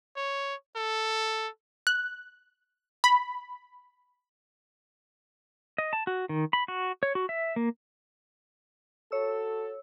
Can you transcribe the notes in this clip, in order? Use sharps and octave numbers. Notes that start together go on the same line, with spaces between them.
C#5
A4
F#6
B5
D#5
A5
F#4
D#3
B5
F#4
C#5
F#4
E5
A#3
F#4 A4 C#5 E6